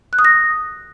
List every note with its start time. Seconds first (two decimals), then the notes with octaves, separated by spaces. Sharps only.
0.13 F#6
0.19 D#6
0.25 A#6